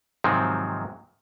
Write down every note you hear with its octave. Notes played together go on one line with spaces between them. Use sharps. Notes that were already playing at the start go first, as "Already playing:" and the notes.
G#2 C3 D#3 F3 F#3 C4